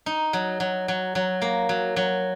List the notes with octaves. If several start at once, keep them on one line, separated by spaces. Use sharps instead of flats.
D#4
F#3
F#3
F#3
F#3
A#3
F#3
F#3